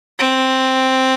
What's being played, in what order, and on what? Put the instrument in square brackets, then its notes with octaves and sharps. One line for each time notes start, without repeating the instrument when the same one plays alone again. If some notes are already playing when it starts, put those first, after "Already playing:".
[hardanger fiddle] C4